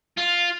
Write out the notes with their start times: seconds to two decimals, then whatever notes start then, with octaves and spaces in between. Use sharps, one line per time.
0.18 F4